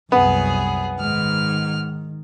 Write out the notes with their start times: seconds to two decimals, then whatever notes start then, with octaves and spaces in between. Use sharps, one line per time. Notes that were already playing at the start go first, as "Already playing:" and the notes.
0.12 C2 F#2 B3 G#4
0.98 G#2 D#3 F6